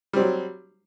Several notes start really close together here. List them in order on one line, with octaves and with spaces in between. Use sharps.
G3 C4 F#3